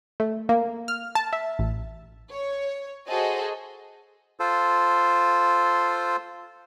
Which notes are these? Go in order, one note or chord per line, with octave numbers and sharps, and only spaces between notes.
A3
A#3
F6
A5
E5
A1
C#5
F#4 G#4 A4 C5 D#5
F4 A4 C5